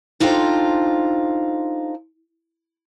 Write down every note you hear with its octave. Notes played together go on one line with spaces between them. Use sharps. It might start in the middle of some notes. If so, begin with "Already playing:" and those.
D4 D#4 F4 A4 C5 G5